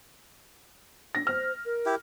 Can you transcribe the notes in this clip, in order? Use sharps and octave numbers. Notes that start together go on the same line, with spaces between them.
D4 A#6
C5 F6
A#4
E4 G4